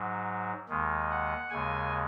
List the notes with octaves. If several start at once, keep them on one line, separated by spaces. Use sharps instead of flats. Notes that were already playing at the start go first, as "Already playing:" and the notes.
Already playing: G#2 F#3
D#2 D#3 G#3
F#5
D#2 C#3 G#3 G#5